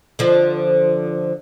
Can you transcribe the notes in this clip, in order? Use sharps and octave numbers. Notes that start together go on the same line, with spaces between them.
D3 F3